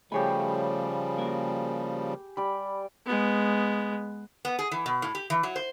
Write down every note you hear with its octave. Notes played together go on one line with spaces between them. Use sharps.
C#3 F3 G3 A3 G4 G#4 C#5 B5
A#3 F#4
G3 D5 B5
G#3 B3
B3
G#4
E3
B2
A2
G4
E3
F#3
C5